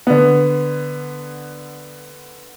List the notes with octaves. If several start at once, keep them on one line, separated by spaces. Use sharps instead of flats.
D3 B3